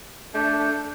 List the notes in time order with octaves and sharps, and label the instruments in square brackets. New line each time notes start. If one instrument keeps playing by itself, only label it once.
[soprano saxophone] A3 [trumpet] D4 [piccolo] G6